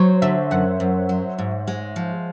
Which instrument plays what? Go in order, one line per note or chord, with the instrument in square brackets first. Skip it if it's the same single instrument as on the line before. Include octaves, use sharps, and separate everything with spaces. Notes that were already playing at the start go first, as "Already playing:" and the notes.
Already playing: [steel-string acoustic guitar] F#3 [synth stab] C5 C#5
[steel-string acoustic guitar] D3 [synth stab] E5
[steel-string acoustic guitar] F#2 [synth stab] F#5
[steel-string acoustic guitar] F#2
F#3
G#2
G#3
F3